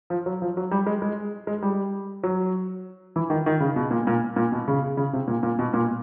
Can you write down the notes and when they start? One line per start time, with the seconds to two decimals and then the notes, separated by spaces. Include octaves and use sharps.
0.10 F3
0.26 F#3
0.42 F3
0.57 F#3
0.71 G3
0.87 G#3
1.02 G#3
1.47 G#3
1.62 G3
2.23 F#3
3.16 E3
3.30 D#3
3.46 D#3
3.60 C#3
3.76 B2
3.91 A#2
4.07 A#2
4.36 A#2
4.52 B2
4.68 C#3
4.97 C#3
5.13 C3
5.28 A#2
5.43 A#2
5.59 B2
5.74 A#2